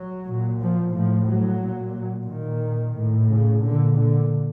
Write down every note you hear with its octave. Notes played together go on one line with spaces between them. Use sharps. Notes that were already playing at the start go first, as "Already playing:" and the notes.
Already playing: F#3
A#2
F3
A2 F3
F#3
A#2
A#2 D#3
A2
C#3
A#2 D3
D3